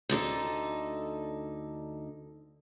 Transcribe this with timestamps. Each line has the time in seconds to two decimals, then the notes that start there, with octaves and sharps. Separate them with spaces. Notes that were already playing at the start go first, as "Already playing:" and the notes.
0.09 D2 D3 D#4 A4